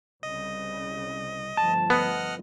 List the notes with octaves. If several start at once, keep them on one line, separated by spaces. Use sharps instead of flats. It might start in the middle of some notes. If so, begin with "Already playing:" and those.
C2 C#3 G3 D#5
G1 F3 A3 A5
B3 D#5 F#5 F6